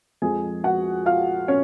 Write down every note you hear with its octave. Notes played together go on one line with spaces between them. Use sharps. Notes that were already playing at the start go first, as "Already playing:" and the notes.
F2 F3 G#3 G#4 G#5
F#4 F#5
F4 F5
C#4 C#5